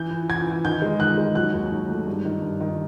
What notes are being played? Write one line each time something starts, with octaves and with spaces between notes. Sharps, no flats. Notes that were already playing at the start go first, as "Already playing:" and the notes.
Already playing: E3 G6
E3
E3 G#6
E3
D#3 G6
G#3
D#3 F#6
G#3
F#3 F#6
D#2
D#3
A3
G2
D#3
G2
D#3